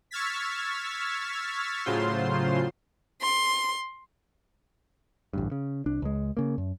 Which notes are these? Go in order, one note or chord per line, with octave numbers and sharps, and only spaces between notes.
C#6 E6 F6 G#6 A6 B6
A2 C#3 F#3 F4 C5 C6
C6
A1 D2 G2
C#3
C2 D4
C#2 G#3
C#3 A#3
F#2